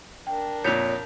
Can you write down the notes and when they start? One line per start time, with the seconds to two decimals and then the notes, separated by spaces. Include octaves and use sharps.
0.27 D4 A#4 G5
0.64 F2 A#2 C#5 G6 B6 F7